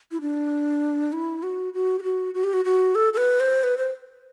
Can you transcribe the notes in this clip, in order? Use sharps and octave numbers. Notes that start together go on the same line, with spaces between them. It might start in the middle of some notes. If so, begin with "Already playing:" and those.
E4
D4
E4
F#4
F#4
G4
F#4
F#4
G4
F#4
F#4
A4
A4
B4
C5
B4
C5